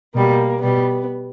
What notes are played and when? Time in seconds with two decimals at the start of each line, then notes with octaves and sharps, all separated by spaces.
0.15 B2 G3 A#3
0.62 B2 G3 B3